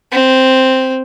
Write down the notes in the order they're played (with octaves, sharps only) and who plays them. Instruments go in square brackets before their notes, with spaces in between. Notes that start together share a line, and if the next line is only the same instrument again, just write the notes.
[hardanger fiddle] C4